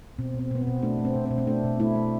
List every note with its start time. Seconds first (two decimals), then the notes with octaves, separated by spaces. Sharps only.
0.19 B2 C4
0.34 B2 C4
0.51 B2 B3
0.61 C4
0.67 B2
0.82 A3 D4
0.99 A3
1.05 C4
1.15 B2
1.25 C4
1.31 B2
1.38 C4
1.47 A3 D4
1.64 B2
1.80 A3 E4
1.95 A3